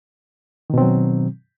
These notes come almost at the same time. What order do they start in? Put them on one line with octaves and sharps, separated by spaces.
D#3 B2 C4 F#3